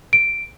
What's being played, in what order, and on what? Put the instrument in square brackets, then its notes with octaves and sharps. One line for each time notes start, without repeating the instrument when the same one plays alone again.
[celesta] D7